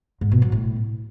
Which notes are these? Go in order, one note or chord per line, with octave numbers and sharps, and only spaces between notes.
G#2
B2
F#3
A2